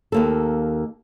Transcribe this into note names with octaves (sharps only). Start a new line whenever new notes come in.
D#2 A#3 A4